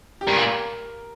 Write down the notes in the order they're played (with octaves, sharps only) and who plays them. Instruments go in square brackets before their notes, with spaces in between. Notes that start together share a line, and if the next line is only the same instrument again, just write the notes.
[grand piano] G4
[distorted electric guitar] G2 [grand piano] A#4
[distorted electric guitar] A#2